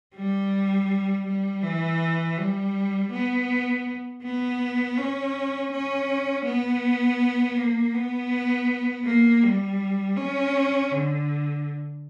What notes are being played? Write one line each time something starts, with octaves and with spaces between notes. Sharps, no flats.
G3
G3
E3
G3
B3
B3
C#4
C#4
B3
A#3
B3
A#3
G3
C#4
D3